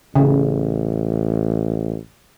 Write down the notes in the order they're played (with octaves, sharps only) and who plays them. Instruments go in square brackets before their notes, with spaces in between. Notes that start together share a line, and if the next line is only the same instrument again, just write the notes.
[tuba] A1 [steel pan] C#3